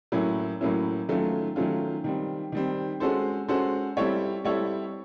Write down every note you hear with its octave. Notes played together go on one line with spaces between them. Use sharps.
A2 F#3 A#3 C#4 E4
A2 F#3 A#3 C#4 E4
D#3 F#3 A3 C#4 F4
D#3 F#3 A3 C#4 F4
D#3 G3 C4
D#3 G3 C4
G#3 C#4 F#4 A4 C5
G#3 C#4 F#4 A4 C5
G3 C4 E4 A4 C#5
G3 C4 E4 A4 C#5